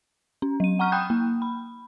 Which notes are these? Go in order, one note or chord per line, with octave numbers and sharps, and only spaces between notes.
C#4
F#3 D#7
F#5 A#5 C#6 F6
G5 B5 D#6 F#6 G6
A#3
B5